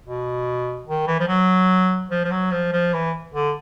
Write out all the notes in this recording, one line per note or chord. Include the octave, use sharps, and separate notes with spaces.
B2
D#3
E3
F3
F#3
F3
F3
F#3
F3
F3
E3
D3